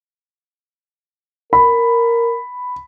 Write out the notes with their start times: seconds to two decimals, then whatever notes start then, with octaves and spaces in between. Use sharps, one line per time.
1.53 A#4 B5